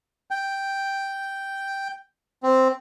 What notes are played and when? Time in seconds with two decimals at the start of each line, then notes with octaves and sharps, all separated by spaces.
0.31 G5
2.43 C4